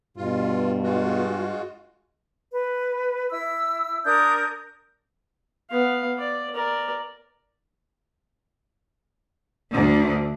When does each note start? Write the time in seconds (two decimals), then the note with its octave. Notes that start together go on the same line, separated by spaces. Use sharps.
0.17 G2 B2 F4
0.83 G#3 F4 F#4
2.52 B4
3.30 E4 E6
4.04 D4 A#4 D#6 G6
5.70 B3 F5
6.19 D5
6.54 A#4 D5
9.72 D2 D3